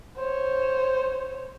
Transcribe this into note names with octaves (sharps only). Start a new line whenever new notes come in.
C5 C#5